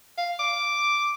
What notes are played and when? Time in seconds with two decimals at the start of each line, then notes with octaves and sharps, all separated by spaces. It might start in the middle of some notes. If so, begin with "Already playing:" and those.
0.18 F5
0.39 D6